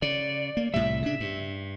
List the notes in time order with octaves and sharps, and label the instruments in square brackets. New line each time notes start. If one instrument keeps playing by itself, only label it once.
[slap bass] C#3 [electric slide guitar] D5
[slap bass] A#3
[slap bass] C2 A2 G3 [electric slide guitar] E5
[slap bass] C#3 D4
G2